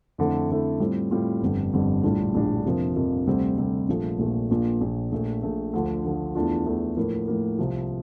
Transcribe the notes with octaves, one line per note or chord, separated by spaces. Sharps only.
F2 D3 A3 E4
F2 D3 A3 E4
A2 G3 C4 F4
A2 G3 C4 F4
G1 F2 D3 G3
G1 F2 D3 G3
A#1 A2 G3 D4 F4
A#1 A2 G3 D4 F4
F2 C3 F3 A#3
F2 C3 F3 A#3
D2 C3 G3 C4
D2 C3 G3 C4
A#1 A#2 F3 A3
A#1 A#2 F3 A3
A#1 A#2 F3
A#1 A#2 F3
A#1 A#2 A3
A#1 A#2 A3
D2 D3 F3
D2 D3 F3
E2 E3 A3 D4 F4
E2 E3 A3 D4 F4
A2 F3 A#3
A2 F3 A#3
C2 C3 F3